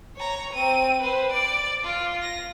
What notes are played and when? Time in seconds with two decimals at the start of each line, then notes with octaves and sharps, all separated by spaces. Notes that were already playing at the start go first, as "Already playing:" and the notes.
0.16 C#5 A#5
0.53 C4 D#7
1.01 B4 C5
1.32 D5 D6
1.84 F4
2.22 A#6